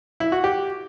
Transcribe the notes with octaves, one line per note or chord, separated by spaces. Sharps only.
E4
F#4
G4